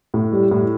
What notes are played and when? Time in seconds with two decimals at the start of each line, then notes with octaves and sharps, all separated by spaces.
0.14 A2
0.32 G3
0.51 A2